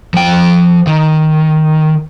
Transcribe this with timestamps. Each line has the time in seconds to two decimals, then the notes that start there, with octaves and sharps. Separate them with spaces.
0.14 F3 G5
0.87 D#3